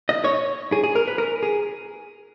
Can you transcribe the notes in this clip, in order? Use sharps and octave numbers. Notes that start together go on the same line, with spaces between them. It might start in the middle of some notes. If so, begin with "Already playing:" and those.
D#5
C#5
G#4
G#4
A#4
B4
A#4
G#4